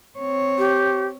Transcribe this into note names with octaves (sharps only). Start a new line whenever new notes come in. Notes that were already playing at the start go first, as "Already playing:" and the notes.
C4 C#5
G4